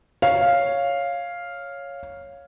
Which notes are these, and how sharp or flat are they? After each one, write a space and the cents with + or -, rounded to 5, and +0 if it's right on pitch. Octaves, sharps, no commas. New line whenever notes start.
C#5 +0 F5 +0